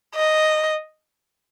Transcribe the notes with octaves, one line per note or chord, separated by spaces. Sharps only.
D#5